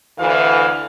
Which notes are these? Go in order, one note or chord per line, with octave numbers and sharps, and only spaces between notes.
D2 E3 A4 F5